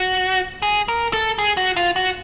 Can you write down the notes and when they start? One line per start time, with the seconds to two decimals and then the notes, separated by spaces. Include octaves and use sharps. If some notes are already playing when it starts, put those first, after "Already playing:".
Already playing: F#4
0.62 G#4
0.88 A#4
1.13 A4
1.38 G#4
1.57 F#4
1.76 F4
1.96 F#4